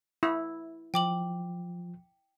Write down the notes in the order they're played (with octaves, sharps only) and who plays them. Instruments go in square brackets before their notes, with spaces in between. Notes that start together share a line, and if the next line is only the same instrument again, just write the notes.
[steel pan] E4
[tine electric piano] F3 [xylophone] G5 D6 F#7